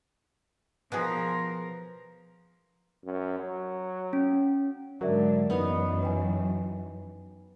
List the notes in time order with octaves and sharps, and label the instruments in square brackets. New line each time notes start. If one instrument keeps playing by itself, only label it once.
[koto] B2 B3 G#4 [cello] F3 A#4
[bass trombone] F#2
F#3
[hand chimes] C#4
[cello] G#2 D3 [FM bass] F#3 [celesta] A#4 D5 E5
[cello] F#2 E3 [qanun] B3 D#4
[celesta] B4 G5 G#5